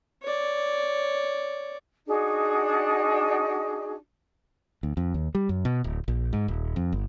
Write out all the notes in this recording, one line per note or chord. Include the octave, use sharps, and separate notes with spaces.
C#5 D5
D4 D#4 F#4 G#4
D2
F2
D#2
G3
F#2
B2
D1
A#1
G#2
D#1
F2
G1